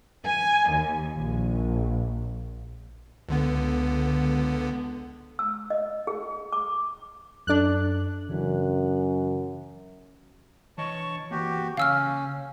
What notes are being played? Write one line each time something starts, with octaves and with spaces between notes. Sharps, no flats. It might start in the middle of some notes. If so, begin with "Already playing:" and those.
G#5
D#2
A#1
C#2 D3 B3
E6
D#5
G#4
D6
F#2 D4 A4 F#6
F#2 C#3 E3
E3 C#5 D#5 A5 C#6
E3 A#3 F#4 G4
C#3 C#4 F5 E6 F6